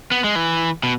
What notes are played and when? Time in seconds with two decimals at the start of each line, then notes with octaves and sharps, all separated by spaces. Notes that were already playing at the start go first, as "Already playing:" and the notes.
0.12 B3
0.24 G#3
0.36 E3
0.83 B2